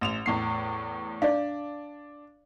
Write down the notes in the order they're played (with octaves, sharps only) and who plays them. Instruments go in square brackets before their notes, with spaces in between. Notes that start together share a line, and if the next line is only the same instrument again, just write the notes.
[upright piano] A1 E7 F7
E2 A2 C7
[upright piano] D4 [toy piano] D5 F5